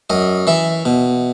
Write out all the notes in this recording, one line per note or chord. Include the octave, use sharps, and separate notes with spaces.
F#2 D#5
E3 E5
B2